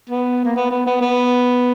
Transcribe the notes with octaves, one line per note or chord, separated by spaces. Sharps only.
B3
A#3
B3
B3
B3
B3